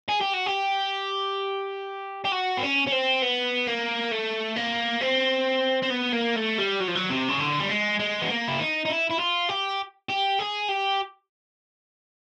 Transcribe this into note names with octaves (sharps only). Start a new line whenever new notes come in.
G#4
G4
F#4
G4
G4
F#4
C4
C#4
C#4
C4
B3
A#3
A3
A#3
C4
C4
B3
A#3
A3
G3
F#3
F3
F#3
C3
C#3
D3
G3
G#3
G#3
B3
A#3
E4
D#4
D#4
E4
E4
F4
G4
G4
G#4
G4